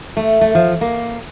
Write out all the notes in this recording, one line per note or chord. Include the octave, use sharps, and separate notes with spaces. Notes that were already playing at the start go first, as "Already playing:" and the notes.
A3
A3
F3
A#3